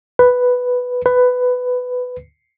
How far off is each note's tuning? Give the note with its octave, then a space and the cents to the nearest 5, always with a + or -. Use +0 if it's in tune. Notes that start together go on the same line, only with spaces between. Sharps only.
B4 +5
B4 +15